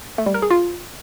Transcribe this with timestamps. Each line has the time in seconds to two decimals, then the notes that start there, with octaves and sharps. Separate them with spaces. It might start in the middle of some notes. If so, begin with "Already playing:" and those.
0.18 A3
0.26 G3
0.34 A#4
0.42 G#4
0.51 F4